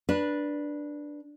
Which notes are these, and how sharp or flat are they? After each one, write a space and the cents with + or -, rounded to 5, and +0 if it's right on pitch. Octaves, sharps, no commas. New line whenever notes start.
D4 +0 B4 -15